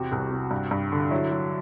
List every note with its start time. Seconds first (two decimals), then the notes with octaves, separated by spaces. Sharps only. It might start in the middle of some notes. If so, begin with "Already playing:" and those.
Already playing: E2 C3 F#4
0.12 C2
0.31 C3
0.51 G2
0.71 G2
0.92 D3
1.11 F#3 E4
1.31 F#3